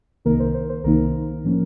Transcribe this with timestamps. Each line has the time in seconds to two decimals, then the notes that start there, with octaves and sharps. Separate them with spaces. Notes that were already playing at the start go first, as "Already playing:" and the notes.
0.25 C2 C3 D#3 A#3 D#4 A#4
0.40 C5
0.54 C5
0.69 C5
0.84 C2 C3 D#3 A#3 D#4 A#4
1.44 A2 F3 A#3 C#4